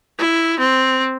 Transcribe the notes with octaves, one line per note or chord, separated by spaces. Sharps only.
E4
C4